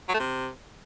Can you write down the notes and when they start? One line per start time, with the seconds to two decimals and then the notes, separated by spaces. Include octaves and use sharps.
0.09 F#3
0.14 A3
0.19 C3